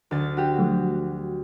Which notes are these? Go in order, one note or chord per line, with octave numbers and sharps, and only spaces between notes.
D2 A6
F#4 G4
F3 F#3 A3